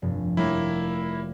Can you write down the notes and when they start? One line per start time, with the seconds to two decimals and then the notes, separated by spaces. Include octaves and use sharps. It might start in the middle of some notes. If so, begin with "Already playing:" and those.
0.02 F1 G2
0.37 G3 A3 A#3 E4 C#5